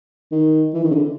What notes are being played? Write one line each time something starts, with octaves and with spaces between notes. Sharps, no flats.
D#3
E3
D#3
C#3
D3